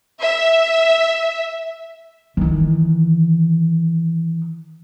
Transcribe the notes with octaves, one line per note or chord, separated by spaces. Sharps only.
E5
D#3 E3